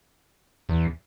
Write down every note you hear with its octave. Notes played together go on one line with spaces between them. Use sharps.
E2